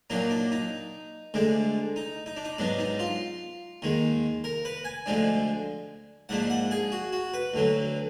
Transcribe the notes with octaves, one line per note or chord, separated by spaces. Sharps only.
A#2 F#3 A#3 D4 D#4
D4
D#4
D2 D3 G#3 D4
D#4
D#4
D4
D#4
G#2 F#3 B3 D4
D#4
F4
D#2 D#3 G#3
A#4
B4
G#5
D2 D3 F3 G#3 D4
G#2 F3 A#3 D4 F#5
F#5
G#4
F#4
F#4
B4
D2 D3 F#3